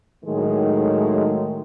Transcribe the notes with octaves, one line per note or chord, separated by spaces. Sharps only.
A2 D#3 F#3 G#3 A3